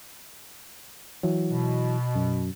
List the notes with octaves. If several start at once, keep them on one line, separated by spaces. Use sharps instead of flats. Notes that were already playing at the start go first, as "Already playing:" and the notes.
E3 F#3
B2
F#2